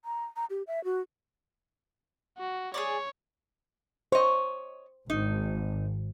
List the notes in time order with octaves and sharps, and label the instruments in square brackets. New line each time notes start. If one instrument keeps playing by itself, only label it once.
[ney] A#5
A#5
G4
E5
F#4
[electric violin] F#4
[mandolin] G#4 A#4 D5 [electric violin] C#5
[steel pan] C5 [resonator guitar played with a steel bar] C#5 D#5
[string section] G#1 [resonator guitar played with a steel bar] D#4